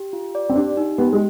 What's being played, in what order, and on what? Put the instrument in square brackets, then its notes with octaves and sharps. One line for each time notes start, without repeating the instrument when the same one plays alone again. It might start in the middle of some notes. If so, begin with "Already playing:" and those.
Already playing: [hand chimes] G4
F4
D5
[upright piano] C4
[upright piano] D4 [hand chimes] G4
[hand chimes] D#4
[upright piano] B3 [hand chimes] G4
[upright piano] G#3